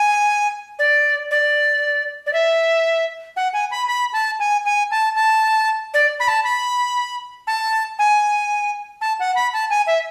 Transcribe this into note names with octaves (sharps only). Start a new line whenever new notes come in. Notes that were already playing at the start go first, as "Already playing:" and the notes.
Already playing: G#5
D5
D5
D5
E5
F#5
G#5
B5
B5
A5
G#5
G#5
A5
A5
D5
B5
A5
B5
A5
G#5
A5
F#5
B5
A5
G#5
E5